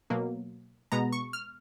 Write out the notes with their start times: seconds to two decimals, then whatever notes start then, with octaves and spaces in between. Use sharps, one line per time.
0.10 B2 F#3 A#3
0.92 B2 G#3 B3 A#5
1.12 C#6
1.33 F6